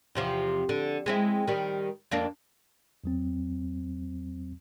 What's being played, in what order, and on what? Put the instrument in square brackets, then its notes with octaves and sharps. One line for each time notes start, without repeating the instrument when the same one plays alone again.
[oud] E2 C3 F3
D3
G#3 C4 E4
D#3 G3
F2 A#3 D4
[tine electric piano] E2 F#3 C4